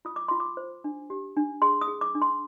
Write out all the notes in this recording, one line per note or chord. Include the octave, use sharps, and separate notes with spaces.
F4 D#6
D6
F4 C6
D6
C5
D4
G4
D4
G#4 C6
D#6
G#4
D6
D4
C6